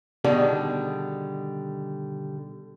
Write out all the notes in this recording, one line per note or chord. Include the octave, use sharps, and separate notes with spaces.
B2 D3 D#3 G3 G#4 A4